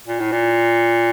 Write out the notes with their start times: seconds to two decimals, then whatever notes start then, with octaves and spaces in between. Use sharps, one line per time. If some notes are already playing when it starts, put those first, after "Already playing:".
0.08 A#2
0.20 A2
0.32 A#2